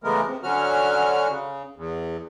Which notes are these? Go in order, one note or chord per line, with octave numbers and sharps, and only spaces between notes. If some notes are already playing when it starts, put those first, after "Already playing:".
C#3 E3 G#3 A3 B3 A#4
C3
D3 F#3 C#4 F#4 F6
C#3
E2